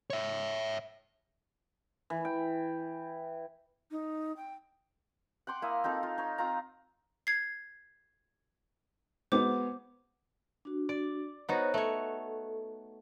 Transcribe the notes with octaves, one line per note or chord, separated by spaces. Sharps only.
C#5 E5
E3
G5
D#4
G5
F#5 G5 C6 D6
A#3 E4 G#5 D#6
C4 D#4 F4 A4
F4
D#4 C#5
C4 F4 A#5
G#6 C7
G#3 B3 F#4 C5 D6
D4 F#4
D5
B3 D#4 F#4 C5 C#5
A3 A4 C#5